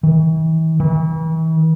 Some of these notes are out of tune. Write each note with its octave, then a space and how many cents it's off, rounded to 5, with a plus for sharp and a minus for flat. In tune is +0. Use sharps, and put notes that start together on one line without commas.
E3 -45
E3 -40